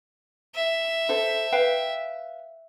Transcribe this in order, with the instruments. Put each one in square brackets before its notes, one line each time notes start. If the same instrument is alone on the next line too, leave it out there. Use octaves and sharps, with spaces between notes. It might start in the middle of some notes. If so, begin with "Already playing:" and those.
[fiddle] E5
[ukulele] A4 C5
B4 F5 G5